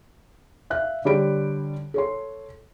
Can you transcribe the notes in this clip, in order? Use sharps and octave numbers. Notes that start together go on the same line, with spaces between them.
E5 F5 F#6
D3 G3 C#5 B5 D7
A4 C#5 C6